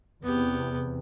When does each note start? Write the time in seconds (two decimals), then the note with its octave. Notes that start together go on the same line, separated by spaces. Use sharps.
0.23 E2 C3 B3 G4